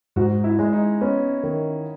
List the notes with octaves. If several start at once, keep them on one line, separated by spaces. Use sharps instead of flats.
G#2 F#4
E4
G#3
D#4
B3 C#4
D#3